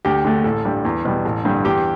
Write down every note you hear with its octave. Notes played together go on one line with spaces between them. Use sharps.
D2 G4
D3 A3
A1 A4
G2 G3
E2
B2 G3
A1
G2 D3 G3
E2 G4